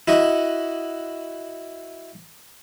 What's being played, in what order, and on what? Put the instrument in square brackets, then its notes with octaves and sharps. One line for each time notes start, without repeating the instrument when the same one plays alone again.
[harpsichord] E4 F#4 D#5